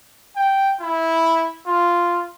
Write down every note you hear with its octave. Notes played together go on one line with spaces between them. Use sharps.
G5
E4
F4